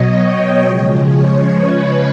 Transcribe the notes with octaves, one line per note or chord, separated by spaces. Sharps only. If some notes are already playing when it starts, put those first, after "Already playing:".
Already playing: B2 F#3 C#5 D#5
G5
C#3 F3 G#3
C#5
B4